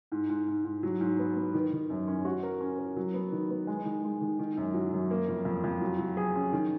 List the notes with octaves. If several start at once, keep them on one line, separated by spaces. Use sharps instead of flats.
G#2
G#2
G#2
G#2
F#3
G#2
B3
B3
D#3
D#3
F#2
C#4
F#4
A#4
C#4
A#4
F#3
B3
D#3
B3
G#3
D#3
G#3
D#3
D#3
F#2
F#3
F#2
A#3
F2
F2
F2
F#3
F#3
G#4
C#4
D#3